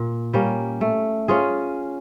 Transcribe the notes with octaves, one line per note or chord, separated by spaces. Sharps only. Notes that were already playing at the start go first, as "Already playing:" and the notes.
Already playing: A#2
G3 A#3 C#4
A3
C#4 F4 G#4